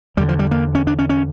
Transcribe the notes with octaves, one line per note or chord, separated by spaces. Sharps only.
E2 D3 G3
F3
G3
A#3
C#4
D4
C#4
C#4